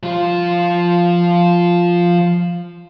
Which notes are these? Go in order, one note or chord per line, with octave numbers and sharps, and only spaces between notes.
F3 F4